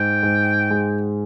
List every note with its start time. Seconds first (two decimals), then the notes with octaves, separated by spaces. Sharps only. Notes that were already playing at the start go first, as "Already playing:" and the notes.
Already playing: G#2 G5
0.23 G#2
0.71 G#3